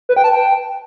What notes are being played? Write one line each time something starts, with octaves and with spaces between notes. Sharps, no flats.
B4
G5
A5
G5